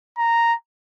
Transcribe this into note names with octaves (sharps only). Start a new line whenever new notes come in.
A#5